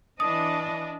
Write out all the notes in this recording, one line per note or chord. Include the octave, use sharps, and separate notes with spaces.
E3 D4 D#5 D#6